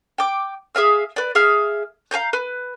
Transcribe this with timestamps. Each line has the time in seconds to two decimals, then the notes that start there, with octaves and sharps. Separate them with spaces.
0.18 G5 D6
0.75 G#4 E5 F5 E6
1.16 B4 D5
1.35 G#4 E5 F5 F6
2.11 F5 G#5 A#5 G6
2.33 B4